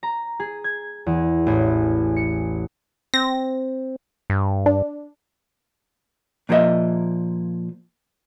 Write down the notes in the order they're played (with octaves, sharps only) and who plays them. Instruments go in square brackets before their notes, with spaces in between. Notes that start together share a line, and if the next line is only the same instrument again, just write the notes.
[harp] A#5
G#4
G#6
E2
A1
C#7
[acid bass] C4 [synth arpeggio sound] A#6
[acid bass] G2
[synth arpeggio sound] D4
[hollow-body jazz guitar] A#2 F3 A#3 G4 D#5 E5